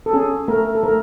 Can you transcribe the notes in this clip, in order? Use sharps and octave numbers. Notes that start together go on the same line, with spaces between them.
A4
C#4 G#4
A3 A#4
A4
A3 A#4